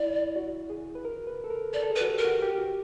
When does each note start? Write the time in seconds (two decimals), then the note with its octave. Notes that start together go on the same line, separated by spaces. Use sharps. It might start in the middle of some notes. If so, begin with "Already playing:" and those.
Already playing: E4 D5
0.36 F#4
0.70 G#4
0.95 B4
1.05 A#4
1.27 B4
1.44 A4
1.50 A#4
1.73 A4 D5
1.83 A4
1.90 G#4
1.96 B4
2.01 F#4
2.07 G4
2.19 A#4
2.25 F#4
2.42 G4
2.58 F#4